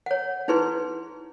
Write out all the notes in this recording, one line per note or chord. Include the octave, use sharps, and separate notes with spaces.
C#5 F#5
D#4 E4 G#4 B4 C6